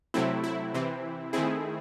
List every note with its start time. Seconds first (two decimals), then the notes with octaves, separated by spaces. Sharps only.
0.14 C3 F#3 A3 C4 E4
0.44 E4
0.74 C3 E3 C4
1.33 D#3 A3 C4 E4 G#4